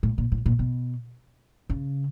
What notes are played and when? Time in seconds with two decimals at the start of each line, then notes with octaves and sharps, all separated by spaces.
0.03 A2
0.18 A#2
0.32 A2
0.46 A#2
0.59 B2
1.69 C#3